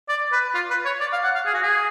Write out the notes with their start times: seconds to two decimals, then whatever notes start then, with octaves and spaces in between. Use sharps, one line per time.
0.08 D5
0.32 B4
0.54 F4
0.70 B4
0.85 C#5
1.00 D5
1.12 F5
1.24 F#5
1.35 F5
1.45 G#4
1.54 F#4
1.63 G#4